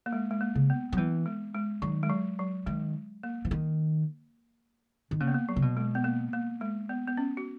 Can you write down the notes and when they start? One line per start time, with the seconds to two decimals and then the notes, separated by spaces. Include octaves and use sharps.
0.06 A#3
0.13 G#3
0.31 G#3
0.41 A#3
0.55 C#3
0.70 B3
0.92 F#3
0.97 E3 B3
1.26 G#3
1.54 G#3
1.82 D#3 F#3
2.03 G#3
2.10 F#3
2.39 F#3
2.66 D#3 G#3
3.23 A#3
3.45 E3
3.51 D#3
5.11 D#3
5.20 C#3 A#3
5.28 B3
5.34 A#3
5.49 F#3
5.56 C#3
5.62 B2
5.77 G#3
5.95 B3
6.04 A#3
6.33 A#3
6.61 G#3
6.89 B3
7.08 B3
7.17 C#4
7.37 F#4